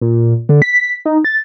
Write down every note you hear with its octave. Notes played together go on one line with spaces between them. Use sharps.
A#2
D3
B6
D#4
A6